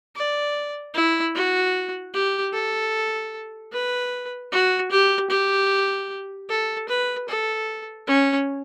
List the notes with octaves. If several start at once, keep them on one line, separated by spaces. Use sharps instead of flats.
D5
E4
F#4
G4
A4
B4
F#4
G4
G4
A4
B4
A4
C#4